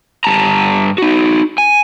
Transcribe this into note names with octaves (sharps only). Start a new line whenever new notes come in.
G2 A5 A#5
D#4 F#4
G#5